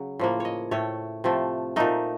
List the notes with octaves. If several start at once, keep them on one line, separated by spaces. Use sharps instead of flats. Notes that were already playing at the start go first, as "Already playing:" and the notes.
Already playing: C#3 F#3
A2 F3 A#3
C#5 D#5
A2 A3 C#5
C3 F3 A3
A#2 A3 D#4